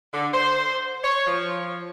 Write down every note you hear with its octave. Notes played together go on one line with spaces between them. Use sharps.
D3
C5
C#5
F3